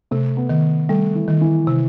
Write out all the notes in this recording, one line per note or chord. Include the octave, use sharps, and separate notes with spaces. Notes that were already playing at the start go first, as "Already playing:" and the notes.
C3 A3
B3
D#3
G3 A3
E3
D#3
E3
C3